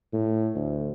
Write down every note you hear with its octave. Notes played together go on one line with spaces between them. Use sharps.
A2
D2